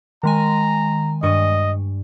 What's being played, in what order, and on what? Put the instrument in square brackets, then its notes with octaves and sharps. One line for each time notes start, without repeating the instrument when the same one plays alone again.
[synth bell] D#3 G#3 G#5 [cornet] A#5
[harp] G2 C#6 D#7 [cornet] D#5